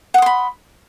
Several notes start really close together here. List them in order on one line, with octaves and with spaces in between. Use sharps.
F#5 D#6 C6 B5